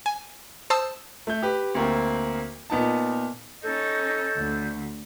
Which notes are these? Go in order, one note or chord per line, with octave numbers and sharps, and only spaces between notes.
G#5
C5 A5 D#6 E6
A3 G6
G4 B4
D2 A#3 C4
A#2 B3 D#4 A5
C#4 D#4 A4 G6
D2